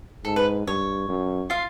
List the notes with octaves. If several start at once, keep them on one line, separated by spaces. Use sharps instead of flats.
G#2 A4
B4
G2 C#5
F#2
F4 F5